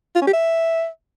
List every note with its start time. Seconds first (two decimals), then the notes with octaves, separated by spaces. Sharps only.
0.16 F4
0.22 C#4
0.28 G4
0.33 E5